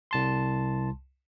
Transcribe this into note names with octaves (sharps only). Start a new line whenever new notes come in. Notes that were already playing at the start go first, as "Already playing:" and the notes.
C2 A5 C6